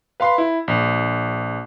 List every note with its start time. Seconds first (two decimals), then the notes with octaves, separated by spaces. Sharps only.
0.20 B4 F5 B5 C6
0.38 E4
0.68 A#1